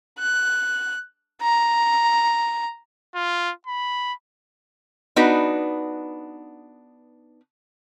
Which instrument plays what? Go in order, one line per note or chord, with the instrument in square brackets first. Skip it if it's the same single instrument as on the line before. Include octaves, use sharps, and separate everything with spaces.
[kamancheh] F#6
A#5
[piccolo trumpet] F4
B5
[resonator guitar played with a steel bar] B3 D4 D#4 F#4 B4